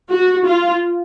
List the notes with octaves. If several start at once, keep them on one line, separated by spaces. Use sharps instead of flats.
F#4
F4